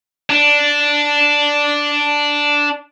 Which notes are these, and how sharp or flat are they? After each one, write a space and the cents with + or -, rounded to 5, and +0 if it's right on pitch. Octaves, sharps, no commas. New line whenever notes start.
D4 -5